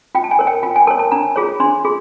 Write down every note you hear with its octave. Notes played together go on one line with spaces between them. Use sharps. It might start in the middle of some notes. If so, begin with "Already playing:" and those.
F4 G5
A5
G#5
A#4 C#5
G5
F4 G5
G#5
A#4 C#5 A5
A5
D4 A#5
F4 G#4 C#5
D4 C6
F4 G#4